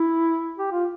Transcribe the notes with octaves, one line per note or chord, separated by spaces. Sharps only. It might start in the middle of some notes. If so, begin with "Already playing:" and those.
Already playing: E4
G4
F4